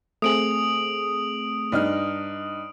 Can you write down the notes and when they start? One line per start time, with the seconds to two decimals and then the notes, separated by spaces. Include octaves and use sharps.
0.22 A3 C4 G#4 D#6 D7 F#7
1.72 G2 D#4 F6